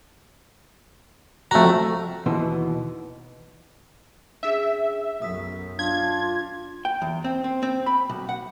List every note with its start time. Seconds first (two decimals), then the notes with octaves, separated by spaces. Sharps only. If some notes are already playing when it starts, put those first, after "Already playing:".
1.51 F2 A3 F#4 A#5
2.26 D#2 B2 E3 B3 D#4 C6
4.43 C#4 D4 G#4 E5
5.22 B1 F#2 D#6 B6
5.79 D4 F4 F5 G#6
6.85 G5
7.02 E2
7.24 C4
7.44 C4
7.63 C4
7.86 B5
8.09 B1
8.29 F#5